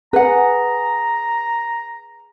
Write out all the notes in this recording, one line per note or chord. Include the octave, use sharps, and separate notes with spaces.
G#4 B4 F#5 A#5